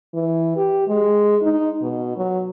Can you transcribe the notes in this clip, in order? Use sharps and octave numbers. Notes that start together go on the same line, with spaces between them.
E3
G4
G#3
D#4
B2
F#3